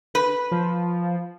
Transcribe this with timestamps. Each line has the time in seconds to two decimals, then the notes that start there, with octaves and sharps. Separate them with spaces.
0.15 B4
0.51 F3